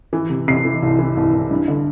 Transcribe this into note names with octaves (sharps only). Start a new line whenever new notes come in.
E3
C3
C3 C7
E3
C2
E3
C2
C2
G2
D3